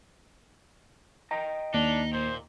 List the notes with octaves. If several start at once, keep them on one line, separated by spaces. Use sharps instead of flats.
D#5 G5 A#5
D#2 D4 D#4
A#2 C5